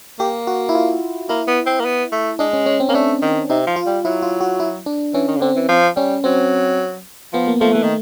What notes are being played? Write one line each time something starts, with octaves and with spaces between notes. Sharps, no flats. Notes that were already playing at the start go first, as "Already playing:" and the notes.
A#3 G4
F#4
E4
F4
A#3 E4
B3
C4
A#3
B3
A3
G#3 D4
C#4
C#4
C4
A#3 C#4
A3 D4
D#3
C3 D#4
F3
F4
G3
F#3 E4
F4
F#4
E4
D4
E3 C#4
D#3
C#3
D3 C4
E3
F3 C4
G3 C#4
F#3 C4
F3 B3
A#3
F3 A3
E3 A3
D#3